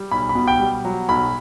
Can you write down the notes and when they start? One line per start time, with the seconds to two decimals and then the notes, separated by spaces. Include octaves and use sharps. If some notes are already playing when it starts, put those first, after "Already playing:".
Already playing: G3
0.11 B1 B5
0.29 B5
0.35 B2
0.48 G5
0.60 G3
0.85 F#3
1.09 B1 B5